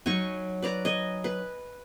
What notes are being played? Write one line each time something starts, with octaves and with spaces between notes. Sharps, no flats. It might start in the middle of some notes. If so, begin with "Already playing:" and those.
F#3 D#4 G#5 C#6
B4 D5 A#5
D#5 G#5
B4